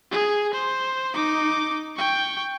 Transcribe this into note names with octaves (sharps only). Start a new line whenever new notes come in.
G#4
C5
D#4 D6
G5 C#6